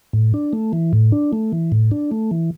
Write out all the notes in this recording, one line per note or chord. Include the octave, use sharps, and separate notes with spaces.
A2
D4
A3
E3
A2
D4
A3
E3
A2
D4
A3
E3